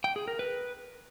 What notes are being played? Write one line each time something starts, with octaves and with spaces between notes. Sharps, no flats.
G5
G#4
A#4
B4